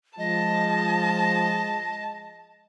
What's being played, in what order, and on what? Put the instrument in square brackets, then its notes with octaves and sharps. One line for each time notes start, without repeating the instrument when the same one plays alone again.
[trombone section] F3 [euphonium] G#3 [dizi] D#5 [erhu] A5